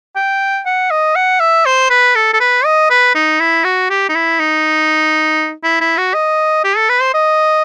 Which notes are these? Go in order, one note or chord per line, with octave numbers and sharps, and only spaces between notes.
G5
F#5
D#5
F#5
E5
C5
B4
A4
A4
B4
D#5
B4
D#4
E4
F#4
G4
D#4
E4
D#4
E4
E4
F#4
D#5
G4
A4
B4
C5
D#5